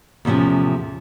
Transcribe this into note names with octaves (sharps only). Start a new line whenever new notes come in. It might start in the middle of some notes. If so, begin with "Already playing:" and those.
E2 A2 C3 F3 C#4